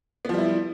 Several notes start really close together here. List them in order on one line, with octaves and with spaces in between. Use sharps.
B3 F3 G3 E4